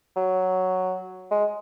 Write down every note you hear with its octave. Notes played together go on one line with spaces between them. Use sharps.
F#3
G#3